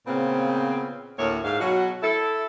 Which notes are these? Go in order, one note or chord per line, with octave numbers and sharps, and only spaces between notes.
A#2 C#3 B3 C4
D2 A2 A3 A#3 C#5
G#2 F5
B2 F#3 F#4
E4 A4